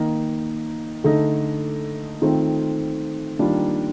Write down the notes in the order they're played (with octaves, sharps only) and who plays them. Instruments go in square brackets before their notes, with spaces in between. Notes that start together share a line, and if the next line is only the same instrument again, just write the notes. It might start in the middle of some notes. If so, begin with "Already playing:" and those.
Already playing: [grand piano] D#3 A#3 D#4
D3 A3 D#4
D#3 A3 C4 F4
D#3 G3 A#3 D4 F4